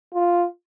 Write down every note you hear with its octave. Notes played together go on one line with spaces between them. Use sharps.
F4